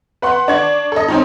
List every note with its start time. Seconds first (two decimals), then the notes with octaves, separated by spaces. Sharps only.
0.22 B4 F#5 C6
0.48 D4 C#6 G#6
0.92 A4 D#5
1.08 C4 C#4 D#4